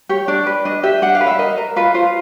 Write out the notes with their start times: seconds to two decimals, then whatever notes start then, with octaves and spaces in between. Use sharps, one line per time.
0.09 G4 C#5
0.28 D4 D5
0.47 B4
0.65 D4 D#5
0.83 G4 E5
1.02 D4 F#5
1.15 F5
1.20 B4
1.27 E5
1.39 A#4 D#5
1.58 A#4
1.76 F4 B4
1.94 F4 C5